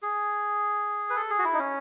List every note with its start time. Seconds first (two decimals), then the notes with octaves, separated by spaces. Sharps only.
0.02 G#4
1.10 B4
1.16 A4
1.30 G#4
1.39 F#4
1.45 E4
1.54 D#4
1.59 C#4